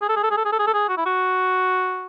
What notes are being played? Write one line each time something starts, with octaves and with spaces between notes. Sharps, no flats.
G#4
A4
G#4
A4
G#4
A4
G#4
A4
G#4
A4
G#4
F#4
E4
F#4